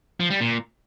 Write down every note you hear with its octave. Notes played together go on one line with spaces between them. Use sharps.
F3
G3
A#2